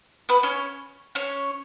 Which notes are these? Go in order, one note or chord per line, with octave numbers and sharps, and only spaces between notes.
B3 B4
C#4 C#5
C#4 C#5